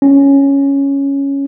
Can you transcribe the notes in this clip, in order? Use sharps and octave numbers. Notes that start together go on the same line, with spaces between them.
C#4